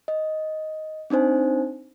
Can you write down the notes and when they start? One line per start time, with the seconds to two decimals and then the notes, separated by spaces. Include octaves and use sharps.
0.08 D#5
1.10 C4 D4 D#4 C5 G#5